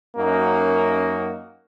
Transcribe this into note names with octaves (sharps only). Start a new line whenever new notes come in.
F#2 A#3 C#4 D#4 F#4 A#4